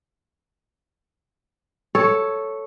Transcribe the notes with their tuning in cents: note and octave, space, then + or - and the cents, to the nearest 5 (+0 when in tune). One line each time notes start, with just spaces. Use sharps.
A4 +0 C#5 +0